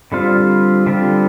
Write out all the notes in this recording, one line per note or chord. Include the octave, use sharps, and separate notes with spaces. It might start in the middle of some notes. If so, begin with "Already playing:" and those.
D3 G3 C4 F4
D3 G3 C4 F4